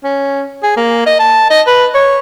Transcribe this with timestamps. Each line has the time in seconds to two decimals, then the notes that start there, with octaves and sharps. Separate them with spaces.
0.04 C#4
0.63 G#4
0.77 A#3
1.06 D#5
1.19 A5
1.50 D#5
1.67 B4
1.95 C#5